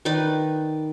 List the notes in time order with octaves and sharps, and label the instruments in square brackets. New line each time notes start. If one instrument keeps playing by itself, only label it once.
[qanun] D#3 D#4 B4 D5